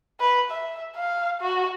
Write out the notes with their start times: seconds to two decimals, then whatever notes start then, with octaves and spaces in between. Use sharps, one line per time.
0.20 B4
0.51 E5
0.96 F5
1.41 F#4